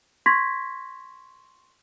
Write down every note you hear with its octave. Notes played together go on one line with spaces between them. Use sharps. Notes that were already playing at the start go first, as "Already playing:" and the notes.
C6 C#6 G#6 A#6 B6